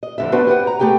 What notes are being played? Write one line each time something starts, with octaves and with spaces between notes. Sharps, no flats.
D#5
F2 D3 E5
B3 D4 F#4 B4 C5
G4 B4 F#5
A#5
A3 B3 G4 G#4 G5